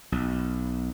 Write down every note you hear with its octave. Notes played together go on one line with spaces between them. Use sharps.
B1